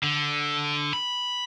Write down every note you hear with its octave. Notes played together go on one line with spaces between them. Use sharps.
D3
B5